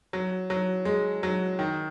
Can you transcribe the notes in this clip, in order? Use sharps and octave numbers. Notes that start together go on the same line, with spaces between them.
F#3
F#3
G#3
F#3
D#3